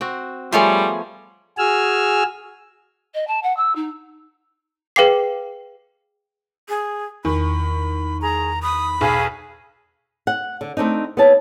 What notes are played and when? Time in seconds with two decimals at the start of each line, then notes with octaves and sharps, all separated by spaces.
0.01 C4 F#4
0.52 F3 G3 A3 B3 G#4 C#5 C6
1.58 F#4 G#4 G#5 E6 F6
3.14 D#5
3.27 A5
3.43 F#5
3.57 E6
3.75 D#4
4.96 G#4 B4 F5 G5 D6 C7
6.69 G#4
7.25 E2 D#3 B5
8.22 G#4 A#5
8.63 B5 D#6
9.01 B1 G#4
10.27 F#5
10.61 D3
10.77 A3 C4 D4 D#4
11.17 B3 E4 C#5 A5